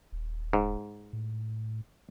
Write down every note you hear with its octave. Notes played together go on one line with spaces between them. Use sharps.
D#1
G#2
A2